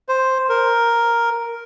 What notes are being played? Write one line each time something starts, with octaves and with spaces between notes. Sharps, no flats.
C5
A#4